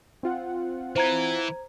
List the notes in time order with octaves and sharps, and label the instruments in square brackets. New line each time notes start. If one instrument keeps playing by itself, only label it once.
[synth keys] C4 F4 F#5
[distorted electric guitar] E3 [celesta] C5 A#5 G#6